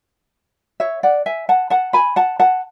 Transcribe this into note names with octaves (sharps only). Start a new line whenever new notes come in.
C#5 E5
D5 F#5
E5 G#5
F#5 A5
F#5 A5
G#5 B5
F#5 A5
F#5 A5